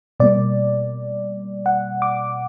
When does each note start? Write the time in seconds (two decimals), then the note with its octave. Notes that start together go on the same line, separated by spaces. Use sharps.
0.20 B2 G3 A#3 D5
1.66 F#5
2.02 D6